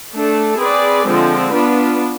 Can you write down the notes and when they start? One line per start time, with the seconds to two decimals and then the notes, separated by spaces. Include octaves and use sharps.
0.13 A3 D4 A4
0.59 C4 G#4 B4 D5
1.06 D3 F3 G#3 C4
1.52 B3 D4 F4 B4